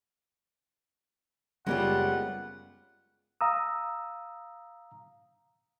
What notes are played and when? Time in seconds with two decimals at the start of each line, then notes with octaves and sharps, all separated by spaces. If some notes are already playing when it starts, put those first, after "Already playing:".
1.66 F#1 G3 G#3 B3 C#4 F4 G4 F#5
3.41 F5 A#5 D#6 E6